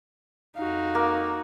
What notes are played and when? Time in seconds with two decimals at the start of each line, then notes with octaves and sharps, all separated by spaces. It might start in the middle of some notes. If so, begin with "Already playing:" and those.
0.56 F2 D#4 F#4 F5
0.95 A#3